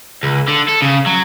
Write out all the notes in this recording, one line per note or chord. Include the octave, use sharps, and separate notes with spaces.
C#2
D3
A4
C#3
F#3